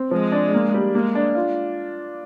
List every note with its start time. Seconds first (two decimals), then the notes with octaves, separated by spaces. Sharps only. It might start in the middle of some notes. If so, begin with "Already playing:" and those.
Already playing: C4
0.11 F3 G#3
0.32 D4
0.54 A#3
0.74 G3
0.94 G#3 A#3
1.15 D4
1.35 F4